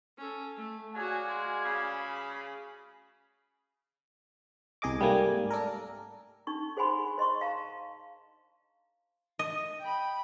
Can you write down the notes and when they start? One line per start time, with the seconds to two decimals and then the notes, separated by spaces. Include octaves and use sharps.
0.18 C#4 A4
0.57 A3
0.95 F#3 F#4 G#4 D5 F5 G#5
1.29 G#3
1.65 C#3 G#4 B5
4.82 C2 G#4 D#5 D6
5.00 G#2 G3 A3 A#3 G#5
5.51 D4 A4 A#4
6.47 D4 D#4 C#6
6.77 G#4 C5 F#5 G#5 B5 C6
7.18 C5 D#5 C6 C#6
7.41 F5 A5 A#5
9.39 D#5
9.80 G5 B5